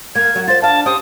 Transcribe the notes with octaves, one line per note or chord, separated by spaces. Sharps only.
A#3 G#6
F#3 F#4
F4 C5 A6
D4 F5 A5
C#4 G4 C5 D#6